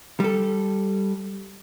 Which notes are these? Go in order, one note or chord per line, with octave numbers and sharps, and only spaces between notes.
G3 A4